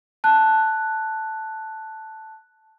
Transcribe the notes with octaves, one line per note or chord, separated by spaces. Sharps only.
A5 F#6